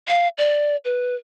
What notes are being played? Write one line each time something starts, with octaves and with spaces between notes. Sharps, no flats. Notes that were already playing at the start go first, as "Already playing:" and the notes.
F5
D5
B4